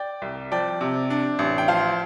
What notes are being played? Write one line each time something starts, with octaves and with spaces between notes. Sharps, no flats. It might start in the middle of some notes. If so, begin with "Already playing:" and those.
Already playing: D5 G5
C2
F3 D5 G5
C3
D4
A1
G5
F3 C5 F5